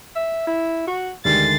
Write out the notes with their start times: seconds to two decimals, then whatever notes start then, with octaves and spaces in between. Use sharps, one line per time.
0.15 E5
0.47 E4
0.87 F#4
1.25 D2 D#3 G3 G#3 A6 C7